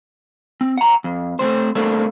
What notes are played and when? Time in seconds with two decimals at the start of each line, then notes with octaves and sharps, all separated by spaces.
0.61 C4
0.78 F#5 A#5
1.04 F2
1.39 A3 A#3 C4 C5
1.75 A3 A#3 C4 D4 A4